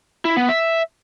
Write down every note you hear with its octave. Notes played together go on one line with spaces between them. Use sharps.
E4
B3
E5